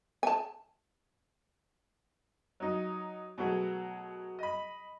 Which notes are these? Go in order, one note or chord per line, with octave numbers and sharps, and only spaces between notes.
G#5 A5
F#3 D#4
B2 F#3 A3 F#4 G#4
D#5 B5